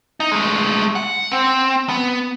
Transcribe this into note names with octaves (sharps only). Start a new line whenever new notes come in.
D#4
G#3 A3
F#5
C4
B3